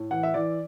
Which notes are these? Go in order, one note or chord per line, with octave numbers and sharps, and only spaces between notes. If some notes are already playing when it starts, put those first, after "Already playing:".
Already playing: A2
E3 F#5
E5
E3 D5